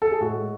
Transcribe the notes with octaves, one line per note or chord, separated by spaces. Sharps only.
A4
G#4
A2 G#3 F#4